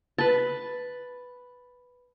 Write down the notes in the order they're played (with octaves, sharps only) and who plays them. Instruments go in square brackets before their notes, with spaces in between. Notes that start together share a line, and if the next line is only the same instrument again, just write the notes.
[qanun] B4 A5